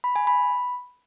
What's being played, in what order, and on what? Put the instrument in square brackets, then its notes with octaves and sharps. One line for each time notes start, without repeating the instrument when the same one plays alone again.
[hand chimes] B5
G#5
B5